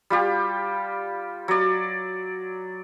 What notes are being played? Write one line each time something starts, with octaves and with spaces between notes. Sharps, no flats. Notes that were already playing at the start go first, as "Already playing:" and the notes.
G3 F4 G4
F#3 D5